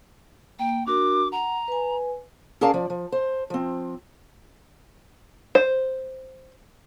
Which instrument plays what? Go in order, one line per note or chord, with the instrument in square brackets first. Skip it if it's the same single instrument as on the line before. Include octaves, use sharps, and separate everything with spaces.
[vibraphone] A#3 [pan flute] G5
[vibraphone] D4 F#4 A#4 [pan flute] D6
[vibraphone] F#5 [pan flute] A#5
[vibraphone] B4 G#5
[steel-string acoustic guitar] C#4 G#4 A#4 D5 F5 A5
F3 D5
F3
C5
F3 C4
[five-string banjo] C5